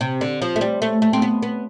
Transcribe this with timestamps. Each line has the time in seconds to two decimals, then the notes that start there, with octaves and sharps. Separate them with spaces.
0.01 C3
0.21 D3
0.42 F3
0.56 A3
0.61 G3
0.82 A3
1.02 A3
1.13 C4
1.22 B3
1.42 B3